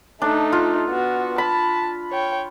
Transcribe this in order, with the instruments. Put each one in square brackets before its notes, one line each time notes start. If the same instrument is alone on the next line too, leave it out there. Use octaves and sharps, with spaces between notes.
[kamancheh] A3 D#4 [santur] D4
[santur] F4
[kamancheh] B3 F#4
[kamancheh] A5 [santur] B5
[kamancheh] C#5 G5